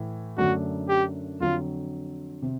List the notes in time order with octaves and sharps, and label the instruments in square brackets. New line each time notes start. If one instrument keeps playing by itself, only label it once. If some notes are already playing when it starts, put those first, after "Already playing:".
Already playing: [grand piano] A2 E3
[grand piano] F#2 D3 F#3 A3 D4 [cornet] F#4
[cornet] G4
[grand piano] F2 D3 F#3 [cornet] F4
[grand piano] C3